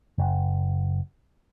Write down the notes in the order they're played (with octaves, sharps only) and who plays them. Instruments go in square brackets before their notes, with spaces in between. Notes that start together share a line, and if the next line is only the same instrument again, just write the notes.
[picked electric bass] F#1